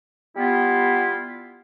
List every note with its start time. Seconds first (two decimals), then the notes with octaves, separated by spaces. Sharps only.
0.36 G3 B3 E4 F4